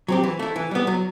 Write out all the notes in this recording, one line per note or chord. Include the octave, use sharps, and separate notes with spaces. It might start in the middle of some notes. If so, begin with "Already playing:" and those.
F#3 C4 G4
E3
A3 E4
E3
G3 B3
F#3